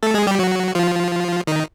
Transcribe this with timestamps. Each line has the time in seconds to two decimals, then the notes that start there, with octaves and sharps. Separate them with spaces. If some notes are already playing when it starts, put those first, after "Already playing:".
0.03 A3 A4
0.14 G#3 G#4
0.27 G3 G4
0.39 F#3 F#4
0.75 F3 F4
1.47 D#3 D#4